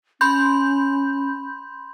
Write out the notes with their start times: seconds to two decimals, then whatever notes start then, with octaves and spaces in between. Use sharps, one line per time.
0.21 C#4 B5 C6 G6